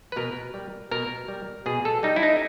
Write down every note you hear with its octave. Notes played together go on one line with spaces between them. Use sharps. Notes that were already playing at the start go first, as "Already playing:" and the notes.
B4
B2 A#4
G3
B2 A#4
G3
B2 G#4
A4
G3 D#4
E4
D#4